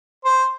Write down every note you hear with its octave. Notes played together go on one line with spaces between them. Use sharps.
C5